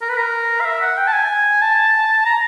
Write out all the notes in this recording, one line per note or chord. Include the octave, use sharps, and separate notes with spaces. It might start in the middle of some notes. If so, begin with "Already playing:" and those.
A#4
B4
A#4
F5
E5
F#5
G5
A5
G#5
A5
A#5